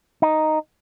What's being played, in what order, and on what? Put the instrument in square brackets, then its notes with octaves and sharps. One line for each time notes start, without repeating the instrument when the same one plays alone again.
[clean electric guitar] D#4